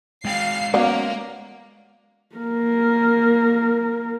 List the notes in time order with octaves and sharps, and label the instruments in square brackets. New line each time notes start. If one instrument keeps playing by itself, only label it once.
[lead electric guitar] G#3 G5 [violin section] F5 C7
[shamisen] F#3 B3 D5 [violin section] A#3 [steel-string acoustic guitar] C#4 F5
[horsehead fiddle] A#3 A#4